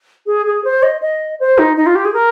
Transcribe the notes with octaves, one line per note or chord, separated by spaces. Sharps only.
G#4
G#4
C5
D#5
D#5
C5
D#4
D#4
F4
G4
G#4
A#4